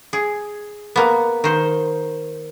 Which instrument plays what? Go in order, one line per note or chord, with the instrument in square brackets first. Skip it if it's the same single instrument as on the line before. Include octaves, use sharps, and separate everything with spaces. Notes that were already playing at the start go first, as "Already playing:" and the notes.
[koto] G#4
A#3 B3
D#3 C5